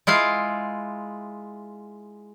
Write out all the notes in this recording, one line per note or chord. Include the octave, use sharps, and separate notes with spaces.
G#3 E4 F4 F5